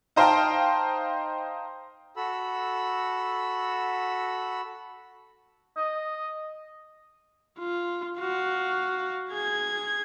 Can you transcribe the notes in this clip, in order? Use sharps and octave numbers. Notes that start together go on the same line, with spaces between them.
D#4 C5 F5 G5 A5 A#5
F#4 A4 B5 E6
D#5
F4
F#4 F5
G#4 G#6